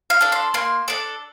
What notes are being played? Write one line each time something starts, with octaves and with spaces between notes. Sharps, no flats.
F5
D4 A4
C6
A#3 C6
D4 A4 D6